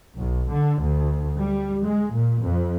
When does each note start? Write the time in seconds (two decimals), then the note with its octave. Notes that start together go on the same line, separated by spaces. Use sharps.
0.18 B1
0.51 D3
0.84 D2
1.41 G3
1.85 G#3
2.15 A#2
2.44 F2